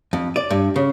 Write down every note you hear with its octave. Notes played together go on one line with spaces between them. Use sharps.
F2
D5
G2
C#3